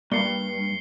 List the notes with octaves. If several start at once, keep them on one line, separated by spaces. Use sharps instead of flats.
G2 A#3 D5 C7 C#7 G7